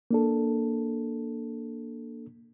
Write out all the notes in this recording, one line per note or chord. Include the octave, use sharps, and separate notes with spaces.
A#3 D4 A4